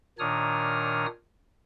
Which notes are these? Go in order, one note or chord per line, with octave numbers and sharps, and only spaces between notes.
A#2 D#3 D4 C#5 D#6 F6